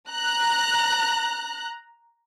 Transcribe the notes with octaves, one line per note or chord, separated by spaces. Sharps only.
A#5 F#6